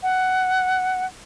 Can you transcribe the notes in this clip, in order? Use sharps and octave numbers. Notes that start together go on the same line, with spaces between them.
F#5